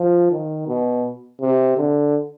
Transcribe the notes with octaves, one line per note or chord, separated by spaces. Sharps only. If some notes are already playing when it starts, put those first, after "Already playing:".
Already playing: F3
D#3
B2
C3
D3